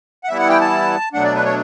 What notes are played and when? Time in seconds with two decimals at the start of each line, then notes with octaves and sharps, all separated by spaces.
0.24 F#5
0.28 E3 G3 B3 E4 E5
0.39 F#5
0.49 G5
0.61 A5
1.13 B2 F#3 A3 D4 F#5
1.24 D5
1.35 B4
1.45 C#5